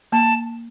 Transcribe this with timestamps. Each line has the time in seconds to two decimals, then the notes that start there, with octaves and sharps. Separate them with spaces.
0.12 A#3 A5